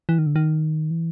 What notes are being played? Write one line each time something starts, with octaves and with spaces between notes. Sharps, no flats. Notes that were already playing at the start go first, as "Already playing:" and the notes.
E3
D#3
D3
D#3
E3